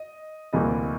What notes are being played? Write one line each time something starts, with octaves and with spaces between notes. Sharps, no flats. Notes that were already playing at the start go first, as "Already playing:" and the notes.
Already playing: D#5
D2 C3 E3 G3 A#3 D#5